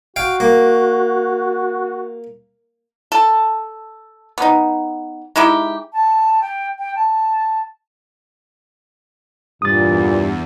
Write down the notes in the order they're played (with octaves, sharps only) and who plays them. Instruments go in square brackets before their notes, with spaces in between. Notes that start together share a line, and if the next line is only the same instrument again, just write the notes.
[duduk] F#4 [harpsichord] F5 G5
[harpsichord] A#3
[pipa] A4
B3 D#4
G#3 D#4 E4 G4
[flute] A5
G5
G5
A5
[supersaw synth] E2 [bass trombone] G2 [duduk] A#2 [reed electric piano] D#6 A6